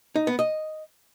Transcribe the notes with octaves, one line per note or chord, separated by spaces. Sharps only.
D#4
B3
D#5